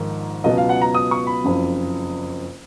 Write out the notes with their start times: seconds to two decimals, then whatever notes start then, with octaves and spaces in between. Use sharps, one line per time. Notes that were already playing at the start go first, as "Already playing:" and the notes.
Already playing: A#1 G#2 D#3 A#3
0.44 C#2 B2 F#3 B3 D#5
0.57 F5
0.69 F#5
0.82 A#5
0.94 D#6
1.11 C#6
1.27 B5
1.44 F#1 F2 C#3